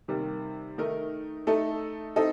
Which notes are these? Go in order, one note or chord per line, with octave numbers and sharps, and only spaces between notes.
C3 D#3 G3 A#3
D#3 A3 D#4 A#4
A3 D#4 A4
C4 D#4 A4 D#5